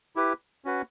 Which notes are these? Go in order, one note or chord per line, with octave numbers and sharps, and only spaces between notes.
E4 G4 B4
C#4 F#4 B4